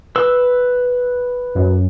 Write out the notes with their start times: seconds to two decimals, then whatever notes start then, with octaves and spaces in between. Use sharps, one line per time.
0.16 B4 E6
1.55 F#2